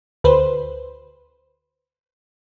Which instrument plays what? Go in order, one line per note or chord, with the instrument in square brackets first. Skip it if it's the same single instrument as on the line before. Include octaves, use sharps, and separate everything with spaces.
[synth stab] D2 B4 C5